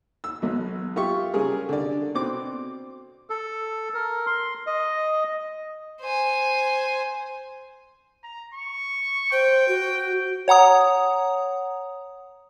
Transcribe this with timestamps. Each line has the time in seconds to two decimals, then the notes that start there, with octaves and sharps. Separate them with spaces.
0.24 E6
0.42 B1 B2
0.96 F4 G4 E5 C#6
1.34 C#3 G3 G#4 A#4
1.69 D3 D5
2.15 B2 C4 D6
3.30 A4
3.94 A#4
4.27 C6
4.67 D#5
6.01 C5 G#5
8.23 A#5
8.54 C#6
9.32 C5 G5
9.68 F#4
10.48 C#5 F#5 A#5 D#6